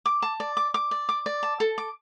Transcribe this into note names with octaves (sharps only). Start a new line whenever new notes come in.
D6
A5
D5
D6
D6
D5
D6
D5
A5
A4
D6